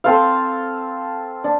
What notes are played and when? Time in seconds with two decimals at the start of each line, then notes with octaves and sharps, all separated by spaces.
0.04 C4 A4 C5 F5
1.44 D4